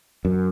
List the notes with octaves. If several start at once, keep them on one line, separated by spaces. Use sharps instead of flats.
F#2